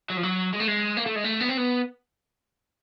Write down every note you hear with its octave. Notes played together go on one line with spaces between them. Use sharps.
F#3
F3
F#3
G#3
A3
G#3
A#3
A3
G#3
A3
B3
C4
B3